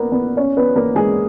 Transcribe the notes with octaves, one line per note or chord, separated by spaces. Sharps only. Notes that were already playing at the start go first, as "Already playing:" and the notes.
Already playing: A#3 B3 A#4
B3 B4
C#4 C#5
B3 B4
A#3 A#4
G#3 G#4